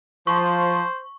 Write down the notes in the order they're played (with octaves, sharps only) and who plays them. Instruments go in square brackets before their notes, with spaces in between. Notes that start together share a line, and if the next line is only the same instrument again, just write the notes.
[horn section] F3 [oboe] C5 [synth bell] C#6